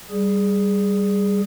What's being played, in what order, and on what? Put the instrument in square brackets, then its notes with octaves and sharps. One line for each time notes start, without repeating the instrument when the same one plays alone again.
[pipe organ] G3 G#4